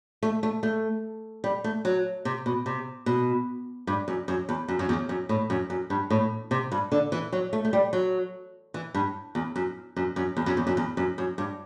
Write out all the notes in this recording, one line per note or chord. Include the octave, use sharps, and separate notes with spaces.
A3
A3
A3
G3
A3
F#3
C3
B2
C3
B2
G2
F#2
F#2
E2
F#2
F#2
E2
F#2
A2
F#2
F#2
G2
A2
C3
G2
D3
E3
F#3
A3
A3
G3
F#3
E3
G2
E2
F#2
F#2
F#2
E2
F#2
E2
F#2
E2
F#2
F#2
G2